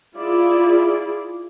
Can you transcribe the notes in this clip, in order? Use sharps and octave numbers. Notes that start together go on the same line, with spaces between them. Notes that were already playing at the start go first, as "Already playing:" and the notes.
E4 F4 G#4 D5